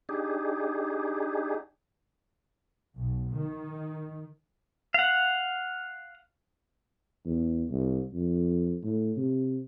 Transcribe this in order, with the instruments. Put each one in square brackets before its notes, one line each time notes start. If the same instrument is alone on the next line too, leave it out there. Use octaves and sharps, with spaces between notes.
[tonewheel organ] D4 D#4 G4 G#4
[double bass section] B1
D#3
[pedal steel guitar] F5 F#5
[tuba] E2
C2
F2
A2
C3